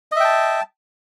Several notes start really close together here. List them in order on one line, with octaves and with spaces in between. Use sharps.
D#5 E5 G5 A5